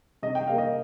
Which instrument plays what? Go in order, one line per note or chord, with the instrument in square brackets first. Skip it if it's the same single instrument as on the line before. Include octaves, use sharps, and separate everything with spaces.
[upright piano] C3 D#5
G5
A#3 F5
D#5